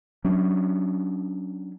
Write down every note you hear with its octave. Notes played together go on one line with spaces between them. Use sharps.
F#3 C#4 D4